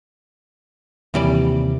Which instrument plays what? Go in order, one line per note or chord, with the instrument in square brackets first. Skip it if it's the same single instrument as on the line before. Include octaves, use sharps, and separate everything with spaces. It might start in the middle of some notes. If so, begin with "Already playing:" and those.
[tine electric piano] D#2 C3 [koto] E3 G3 D5